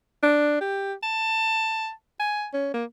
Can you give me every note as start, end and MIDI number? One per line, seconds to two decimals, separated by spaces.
0.23 0.57 62
0.61 0.93 67
1.03 1.91 81
2.20 2.47 80
2.54 2.70 61
2.74 2.84 58